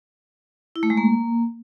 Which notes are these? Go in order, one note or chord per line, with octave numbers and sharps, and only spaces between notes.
E4
A3
G#3
A#3